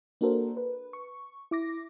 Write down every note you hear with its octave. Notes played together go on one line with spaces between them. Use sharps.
A#3 D4 F#4 A4 A#4 C5
B4
C#6
E4 D6 A#6